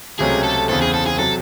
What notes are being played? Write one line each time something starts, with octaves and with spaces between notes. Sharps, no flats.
C#2 C3 F#3 A3 C#4 G#4
A4
E2 C#3 E3 C4 A4
G#4
A4
G#4
C3 F#3 A4